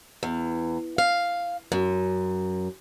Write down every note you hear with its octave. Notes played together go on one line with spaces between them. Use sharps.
E2
F5
F#2